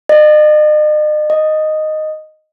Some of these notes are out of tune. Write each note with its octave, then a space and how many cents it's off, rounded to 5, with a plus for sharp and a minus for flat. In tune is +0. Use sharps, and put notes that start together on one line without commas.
D#5 -45
D#5 -5